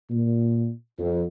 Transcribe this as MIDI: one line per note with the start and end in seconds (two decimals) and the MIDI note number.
0.10 0.71 46
0.99 1.24 41